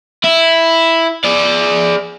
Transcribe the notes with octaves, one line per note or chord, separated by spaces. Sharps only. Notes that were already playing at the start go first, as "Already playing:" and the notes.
E4
G#4 D5